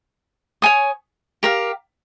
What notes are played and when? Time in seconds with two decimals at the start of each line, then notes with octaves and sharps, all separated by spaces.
0.62 C#5 G#5 D#6
1.43 G4 A#4 F5